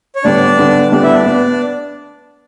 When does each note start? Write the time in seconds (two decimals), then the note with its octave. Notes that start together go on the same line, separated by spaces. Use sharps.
0.15 C#5
0.24 D3 G3 B3 D4 D5
0.58 D3 G3 B3
0.92 D3 G3 B3 D4 D5
1.03 E4 E5
1.14 D4 D5
1.26 B3